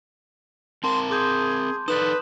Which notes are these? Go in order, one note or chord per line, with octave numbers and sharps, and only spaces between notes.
C4 A#4 A5 C6
G#4 C6 D6 G6
D#4 A4 B4 D5 D#6 E7 F#7